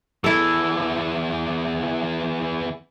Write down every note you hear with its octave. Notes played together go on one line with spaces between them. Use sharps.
E2 E3 E4 A4